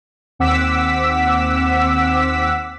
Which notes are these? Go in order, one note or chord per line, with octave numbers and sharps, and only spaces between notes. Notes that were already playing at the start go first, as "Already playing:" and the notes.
D#2 C4 F#5 D6 E6 B6